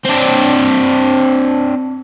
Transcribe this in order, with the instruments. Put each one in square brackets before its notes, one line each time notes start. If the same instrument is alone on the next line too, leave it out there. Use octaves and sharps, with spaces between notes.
[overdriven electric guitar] C4 D4